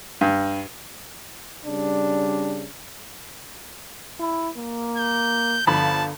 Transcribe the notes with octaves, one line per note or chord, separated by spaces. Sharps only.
G2
C#3 G3 D4
E4
A#3
G6
G1 D3 F3 A5 B5